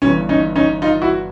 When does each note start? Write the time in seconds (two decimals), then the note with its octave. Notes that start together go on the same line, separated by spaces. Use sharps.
0.02 G1 G2 E3 C#4
0.29 C#4 D#4
0.55 C#4 D#4
0.82 D#4 F4
1.02 E4 F#4